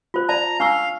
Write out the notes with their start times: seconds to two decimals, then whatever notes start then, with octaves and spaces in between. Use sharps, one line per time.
0.14 F4 C5
0.29 D5 A5 A#5
0.60 D4 F5 C#6 E6